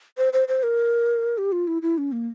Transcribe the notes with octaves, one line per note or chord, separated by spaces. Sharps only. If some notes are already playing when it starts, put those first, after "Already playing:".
C5
C5
C5
A#4
G4
F4
E4
E4
C#4
A#3